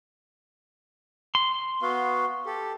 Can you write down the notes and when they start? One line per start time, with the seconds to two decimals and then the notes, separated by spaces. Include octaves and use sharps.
1.35 C6
1.82 B3 F#4 F5
2.46 G4 A4